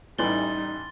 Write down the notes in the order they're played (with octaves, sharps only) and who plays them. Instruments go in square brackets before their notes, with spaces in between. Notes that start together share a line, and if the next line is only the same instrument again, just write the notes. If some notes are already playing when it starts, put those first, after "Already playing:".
[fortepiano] A1 E3 [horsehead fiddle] G3 D#4 [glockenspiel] C6 A6 G7